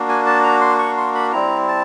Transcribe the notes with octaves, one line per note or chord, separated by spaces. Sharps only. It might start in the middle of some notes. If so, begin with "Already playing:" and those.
Already playing: A#3 D4 F#4
G#5
A5
A#5
C6
C#6
C6
B5
G3 C4 E4 A#5
A5